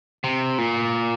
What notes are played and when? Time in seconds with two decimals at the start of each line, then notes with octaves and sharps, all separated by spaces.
0.24 C3
0.58 A#2